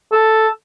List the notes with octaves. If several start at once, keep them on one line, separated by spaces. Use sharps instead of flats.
A4